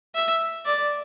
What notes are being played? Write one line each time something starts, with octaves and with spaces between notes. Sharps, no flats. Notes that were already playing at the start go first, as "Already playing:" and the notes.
E5
D5